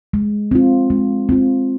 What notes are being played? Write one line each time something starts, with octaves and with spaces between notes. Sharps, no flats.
G#3
C4 F4
G#3
C4 F4